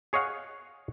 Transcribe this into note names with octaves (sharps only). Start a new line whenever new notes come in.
G#4 C#5 D#5 F5 F#5